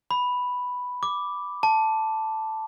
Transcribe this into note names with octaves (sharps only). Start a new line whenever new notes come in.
B5
D6
A5